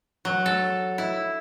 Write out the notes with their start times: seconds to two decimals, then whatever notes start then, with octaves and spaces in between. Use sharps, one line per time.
0.25 F#3
0.46 A4
0.98 E4